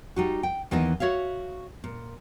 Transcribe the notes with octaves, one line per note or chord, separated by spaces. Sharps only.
G3 D#4 F#4
G5
D#2 E3 B3 D#4 D#5
F#4 C#5 E5 F5
A#2